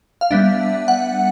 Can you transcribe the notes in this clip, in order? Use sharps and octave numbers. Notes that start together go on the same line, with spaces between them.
F5
G3 B3 D4 E5
F#5